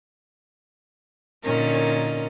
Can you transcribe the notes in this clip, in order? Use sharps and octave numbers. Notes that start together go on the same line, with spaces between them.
A#2 D3 C#4 D#4 A#4